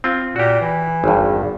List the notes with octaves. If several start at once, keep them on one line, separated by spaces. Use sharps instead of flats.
C4 F4
A#2 F#4 G4
E3
G#1 G2
E2